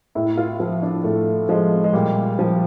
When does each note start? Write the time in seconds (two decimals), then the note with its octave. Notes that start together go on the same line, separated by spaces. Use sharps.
0.15 A2 E4
0.37 F4
0.60 F3 F4
0.82 D4
1.04 A2 A3
1.49 F3 G#3
1.84 G#3
1.93 A#2 G3
2.39 F3